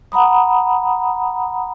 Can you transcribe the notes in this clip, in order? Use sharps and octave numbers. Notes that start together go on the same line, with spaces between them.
F#5 A#5 B5 D#6